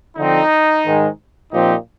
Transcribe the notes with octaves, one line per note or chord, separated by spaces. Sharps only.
D3 F3 C4 D#4
G#2 D#3 G#3
A#2 F3 C4 D#4 G4